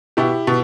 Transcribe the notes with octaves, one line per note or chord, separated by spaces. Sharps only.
B2 E4 G4
B2